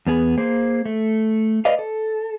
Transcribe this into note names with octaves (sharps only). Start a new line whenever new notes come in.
E2 B3 G#4
A#3 G#4 C5
A3
B4 D5 D#5 F5
A4